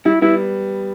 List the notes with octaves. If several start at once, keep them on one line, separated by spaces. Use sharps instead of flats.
G3 E4
G3 B3 E4